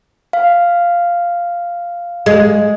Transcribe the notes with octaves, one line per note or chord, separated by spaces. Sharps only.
F5
G#3